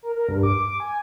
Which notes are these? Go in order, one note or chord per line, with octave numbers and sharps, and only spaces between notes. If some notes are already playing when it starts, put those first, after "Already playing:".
A#4
A#4
G2
D6
D6
G#5